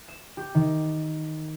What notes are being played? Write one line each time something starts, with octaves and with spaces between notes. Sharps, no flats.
E7
G4
D#3